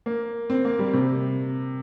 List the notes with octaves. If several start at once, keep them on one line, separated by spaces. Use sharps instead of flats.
A#3
C4
A#3
G3
C3